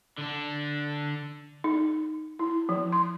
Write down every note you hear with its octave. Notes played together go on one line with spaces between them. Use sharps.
D3 D4
D#4
E4
F3
C6